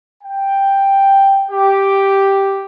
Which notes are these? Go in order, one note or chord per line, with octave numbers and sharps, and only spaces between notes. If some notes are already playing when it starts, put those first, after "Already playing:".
G5
G4